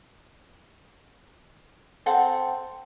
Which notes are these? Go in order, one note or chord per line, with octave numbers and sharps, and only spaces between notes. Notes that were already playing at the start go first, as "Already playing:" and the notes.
C4 A4 F#5 A5